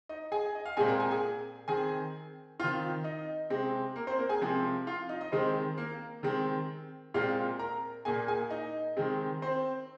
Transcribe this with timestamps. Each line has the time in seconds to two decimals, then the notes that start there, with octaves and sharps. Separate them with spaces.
0.09 D#4 D#5
0.32 G#4 G#5
0.55 D#5
0.66 F5
0.77 A#2 G#3 C4 G#4 G#5
0.88 A#4 A#5
1.00 G#4 G#5
1.11 G#4 G#5
1.68 D#3 C4 G#4 G#5
2.60 D#3 C4 F4 F5
3.04 D#4 D#5
3.50 C3 G#3 C4
3.96 A#3 A#4
4.07 C4 C5
4.18 A#3 A#4
4.29 G#4 G#5
4.41 C3 F3 G#3 C4
4.87 F4 F5
5.09 D#4 D#5
5.21 D#5
5.32 D#3 G#3 C4 C5
5.77 A#3 A#4
6.23 D#3 G#3 C4
7.14 A#2 G#3 C4 F4 F5
7.59 A#4 A#5
8.05 A#2 A#3 G#4 G#5
8.28 G#4 G#5
8.50 D#4 D#5
8.97 D#3 G#3 C4
9.42 C4 C5